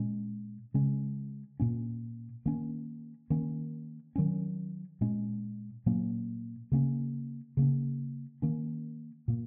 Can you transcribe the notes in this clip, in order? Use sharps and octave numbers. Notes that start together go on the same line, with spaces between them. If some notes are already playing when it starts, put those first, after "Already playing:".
Already playing: A#2 G#3 C#4
C#3 G#3 C#4
A#2 A#3 C#4
D#3 A#3 C#4
D#3 A#3 C#4
D#3 F#3 C#4
A#2 G#3 C#4
A#2 F#3 A#3 C#4
C#3 A#3 C#4
C#3 A#3 C#4
D#3 A#3 C#4
A#2 A#3